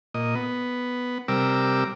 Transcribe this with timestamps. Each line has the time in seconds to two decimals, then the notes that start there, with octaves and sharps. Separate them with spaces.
0.14 A#2 D#5
0.35 B3
1.28 C3 G3 A#4 D6 E6